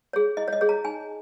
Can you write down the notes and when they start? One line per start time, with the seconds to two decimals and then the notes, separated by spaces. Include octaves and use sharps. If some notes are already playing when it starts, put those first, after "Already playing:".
0.13 G#4 C#5
0.37 E4 D#5
0.48 C#5
0.53 D#5
0.61 G#4 C#5
0.69 A#5
0.85 D#4 G#5